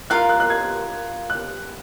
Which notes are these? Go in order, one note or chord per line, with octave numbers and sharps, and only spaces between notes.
F4 A#4 F5 F#6
F#6
F#6
G#6
F#6